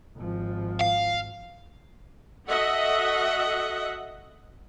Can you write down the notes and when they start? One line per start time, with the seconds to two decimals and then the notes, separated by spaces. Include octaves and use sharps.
0.16 G#1 F3
0.81 F5
2.48 F#4 A4 D#5 E5 F#5